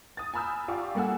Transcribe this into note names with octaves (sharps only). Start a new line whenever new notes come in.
D#6 A6
G#5 A#5 B5 E6 F6 G6
F4 G4 D5 F5 C#6 D6
G3 A#3 A4 F#5 G#5 E6